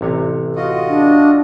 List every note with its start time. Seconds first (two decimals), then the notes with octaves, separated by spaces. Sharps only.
0.01 A1 C3 C#5
0.56 F4 F#4 D#5
0.88 D4